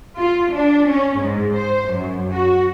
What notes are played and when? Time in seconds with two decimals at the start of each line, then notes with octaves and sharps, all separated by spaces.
0.18 F4
0.51 D4
0.89 C#4
1.20 G#2
1.55 C5
1.91 F#2
2.33 F#4